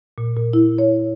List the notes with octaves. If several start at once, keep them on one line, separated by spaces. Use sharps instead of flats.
A#2
A#2
E4
C#5